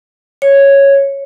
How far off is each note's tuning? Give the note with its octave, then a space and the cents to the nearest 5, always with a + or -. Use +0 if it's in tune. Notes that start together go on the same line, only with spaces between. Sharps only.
C#5 -5